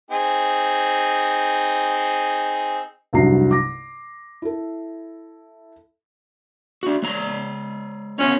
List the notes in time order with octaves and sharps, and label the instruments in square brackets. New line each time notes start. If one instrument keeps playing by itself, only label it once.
[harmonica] C4 D#4 G#4
[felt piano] F1 C2 G2 F#3 A#5 C7
D6 A#6
E4 A4
[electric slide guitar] D4 F#4
G#3 C#5 A#5
[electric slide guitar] B3 F4 C#5 [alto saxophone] C#4